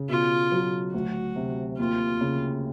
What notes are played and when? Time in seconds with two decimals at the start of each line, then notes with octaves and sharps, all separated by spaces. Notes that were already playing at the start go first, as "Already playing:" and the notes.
Already playing: C#3
0.09 B2 F4
0.52 F#3
0.94 D2 F#4
1.36 C3
1.78 D#2 F4
2.21 C#3